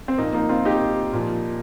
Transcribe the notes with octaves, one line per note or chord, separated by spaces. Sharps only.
C4
A#2 F3 A#3 D#4
A#3 D#4
C4 F4
D#4 G4
A#2 F3